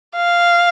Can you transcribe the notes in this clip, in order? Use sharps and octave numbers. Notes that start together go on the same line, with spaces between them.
F5